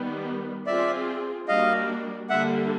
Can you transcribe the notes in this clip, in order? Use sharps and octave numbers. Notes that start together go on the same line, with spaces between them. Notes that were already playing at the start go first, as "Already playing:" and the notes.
Already playing: D#3 G3 B3
C4 F4 G#4 D5 E5
G3 A#3 D4 F#4 D#5 F5
D3 G3 A#3 D4 E5 F#5